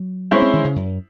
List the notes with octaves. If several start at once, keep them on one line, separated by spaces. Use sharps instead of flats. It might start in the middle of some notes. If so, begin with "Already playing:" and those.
Already playing: F#3
G#3 C#4 E4 C5 E5
C4
D#3
C#3
F#2